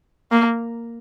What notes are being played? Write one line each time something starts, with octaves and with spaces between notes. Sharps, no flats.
A#3